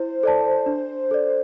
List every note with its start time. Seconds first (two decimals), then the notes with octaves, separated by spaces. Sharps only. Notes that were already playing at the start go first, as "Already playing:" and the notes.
Already playing: E4 C5
0.23 A4 D5 A5
0.66 D4
1.11 A4 D5